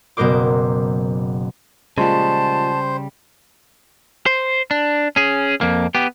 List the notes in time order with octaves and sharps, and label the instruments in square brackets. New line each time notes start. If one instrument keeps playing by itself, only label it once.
[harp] F#1 B2 B3 A#4 C5 D6
[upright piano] A#2 F3 G#3 [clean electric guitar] C#3 G3 [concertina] C5 [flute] A5
[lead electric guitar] C5
D4
C#4 G#4
F2 A#3
B3 G4